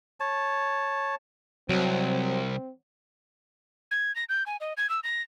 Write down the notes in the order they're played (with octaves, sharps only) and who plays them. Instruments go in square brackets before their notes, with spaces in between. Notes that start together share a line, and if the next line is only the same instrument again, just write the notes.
[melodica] C#5 A5
[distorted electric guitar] C2 [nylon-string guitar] F#3 [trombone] C4
[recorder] G#6
A#6
G6
G#5
D#5
G#6
E6
A#6